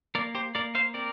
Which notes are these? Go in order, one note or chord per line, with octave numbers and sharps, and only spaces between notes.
A#3 A#4 D5
G4 C5
A#3 A#4 D5
C5 F5
C4 A#4 D5